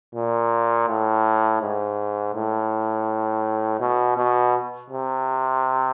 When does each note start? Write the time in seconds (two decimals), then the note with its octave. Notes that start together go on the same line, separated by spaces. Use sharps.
0.15 A#2
0.89 A2
1.62 G#2
2.35 A2
3.80 B2
4.17 B2
4.90 C3